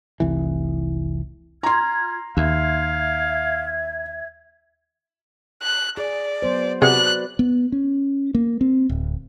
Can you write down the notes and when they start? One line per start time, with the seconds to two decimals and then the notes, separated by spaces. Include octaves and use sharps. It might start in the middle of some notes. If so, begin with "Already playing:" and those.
0.20 F1 C2 E3
1.63 F4 A#5 C6 F6 G#6
2.37 D#2 E5 F5 G#6
5.62 F#6
5.97 G#4 D5
6.42 F#3 B3 C5
6.82 C3 F#4 G#4 B4 D5 F#5 F#6
7.39 B3
7.72 C#4
8.34 A#3
8.61 C4
8.89 D1